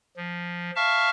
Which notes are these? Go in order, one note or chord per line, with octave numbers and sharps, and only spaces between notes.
F3
E5 F5 A5 C#6 F6